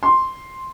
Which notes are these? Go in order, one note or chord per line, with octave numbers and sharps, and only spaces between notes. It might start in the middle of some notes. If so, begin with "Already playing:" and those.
C6